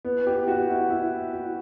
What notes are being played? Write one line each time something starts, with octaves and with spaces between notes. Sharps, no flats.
B3
G4
F#4
E4
E4
F#4